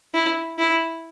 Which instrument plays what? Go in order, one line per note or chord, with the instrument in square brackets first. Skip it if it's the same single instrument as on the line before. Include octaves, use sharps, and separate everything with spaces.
[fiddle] E4
E4